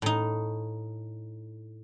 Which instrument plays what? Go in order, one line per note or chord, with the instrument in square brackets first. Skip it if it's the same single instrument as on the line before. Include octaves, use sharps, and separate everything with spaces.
[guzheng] A2 D#4